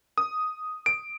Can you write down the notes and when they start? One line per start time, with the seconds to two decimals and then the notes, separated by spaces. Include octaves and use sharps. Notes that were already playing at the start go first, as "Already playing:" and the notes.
0.18 D#6
0.86 D7